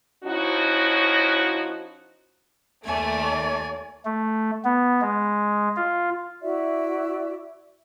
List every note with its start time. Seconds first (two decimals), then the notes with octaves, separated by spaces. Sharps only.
0.24 F3 C#4 D#4 E4 F#4
2.85 D#2 A3 D5 G#5
4.05 A3
4.65 B3
5.02 G#3
5.76 F4
6.41 E4 F#4 D5 E5